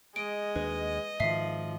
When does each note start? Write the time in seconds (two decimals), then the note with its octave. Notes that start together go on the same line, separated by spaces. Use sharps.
0.16 G#3 D#5 D7
0.56 D#2 D4 B4
1.20 G#2 D#3 F3 E5 C7